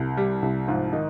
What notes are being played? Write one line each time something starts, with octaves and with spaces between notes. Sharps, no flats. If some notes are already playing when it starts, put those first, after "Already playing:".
Already playing: C2
G3
C2
G#2 F3 F4
D#3 D#4